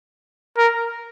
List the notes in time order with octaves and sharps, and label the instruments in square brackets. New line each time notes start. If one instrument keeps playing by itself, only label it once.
[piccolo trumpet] A#4